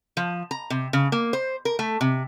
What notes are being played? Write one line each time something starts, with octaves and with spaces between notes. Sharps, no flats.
F3
A#5
C3
C#3
A#3
C5
A#4
A3
C3